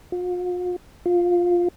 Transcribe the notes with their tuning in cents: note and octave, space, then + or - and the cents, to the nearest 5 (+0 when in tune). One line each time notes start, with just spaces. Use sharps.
F4 +45
F4 +10